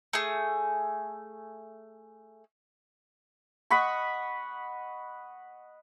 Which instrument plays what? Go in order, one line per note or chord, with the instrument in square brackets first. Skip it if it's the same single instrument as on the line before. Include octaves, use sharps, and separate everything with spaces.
[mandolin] A3 G#4
[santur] D#5 F#5 B5 C#6